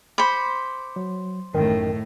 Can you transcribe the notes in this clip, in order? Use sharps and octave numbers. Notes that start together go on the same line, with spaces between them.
C5 B5 D6 C#7
F#3
A1 F#2 A2 D#3 G5